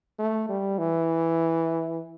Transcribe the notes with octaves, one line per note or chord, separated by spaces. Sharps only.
A3
G3
E3